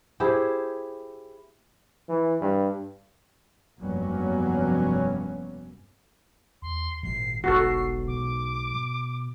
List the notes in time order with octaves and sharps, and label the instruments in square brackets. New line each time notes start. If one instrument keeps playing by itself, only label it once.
[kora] E4 G4 G#4 C5
[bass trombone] E3
G2
[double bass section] F1 G2 F#3 A#3 B3 C#4
[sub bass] E2 [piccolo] C6
[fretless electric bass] G#1 [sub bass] A#2 [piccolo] C7
[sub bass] F1 [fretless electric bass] B1 G#2 [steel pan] F#4 A4 [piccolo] C7
[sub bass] B2 [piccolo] D6